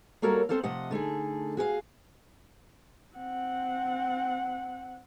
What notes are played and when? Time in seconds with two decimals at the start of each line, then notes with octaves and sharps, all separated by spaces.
0.22 G3 A#3 F#4 A4 A#4 C#5
0.49 B3 C4 A4 C5 D5 F5
0.63 C3 F3 A3 D#5 F#5
0.91 D3 A3 D#4 G#4
1.57 F#4 G#4 B4 F5
3.16 C4 F#5